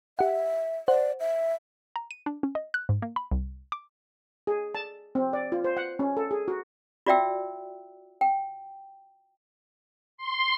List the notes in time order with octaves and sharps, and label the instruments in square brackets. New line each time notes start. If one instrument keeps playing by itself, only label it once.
[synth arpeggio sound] G4 F#5 [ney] E5
[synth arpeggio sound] C5 F#5 [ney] D5
[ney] E5
[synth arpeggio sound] A#5
D#7
D4
C#4
D#5
F#6
G#2
A#3
B5
C2
D6
[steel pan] G#4
A5
C4
D5
F4
C5
F#5
C#4
A4
G#4
F#4
[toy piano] F4 F#4 D5 E5 G5 E6
G5
[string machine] C6